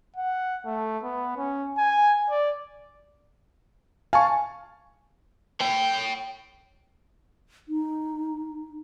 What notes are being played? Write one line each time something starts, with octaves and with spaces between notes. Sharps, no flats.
F#5
A3
B3
C#4
G#5
D5
F5 G#5 A5 C#6
C#5 G5
D#4